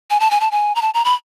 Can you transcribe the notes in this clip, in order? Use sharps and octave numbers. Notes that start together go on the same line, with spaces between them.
G#5
A5
G#5
A5
G#5
A#5
A5
A#5
B5